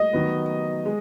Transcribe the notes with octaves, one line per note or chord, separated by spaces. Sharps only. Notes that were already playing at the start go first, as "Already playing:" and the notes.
Already playing: D#5
D#3 F#3 B3
G#3